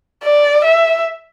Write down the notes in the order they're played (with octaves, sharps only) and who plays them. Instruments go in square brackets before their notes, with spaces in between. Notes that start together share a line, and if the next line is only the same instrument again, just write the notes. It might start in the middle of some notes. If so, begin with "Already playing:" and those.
[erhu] D5
E5